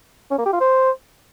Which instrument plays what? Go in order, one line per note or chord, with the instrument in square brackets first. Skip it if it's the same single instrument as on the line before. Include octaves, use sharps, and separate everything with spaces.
[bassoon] C#4
A#3
G4
F4
C5